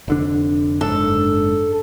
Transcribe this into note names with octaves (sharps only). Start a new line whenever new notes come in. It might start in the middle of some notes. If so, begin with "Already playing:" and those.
F1 D3 D4
F#1 G#2 D4 A4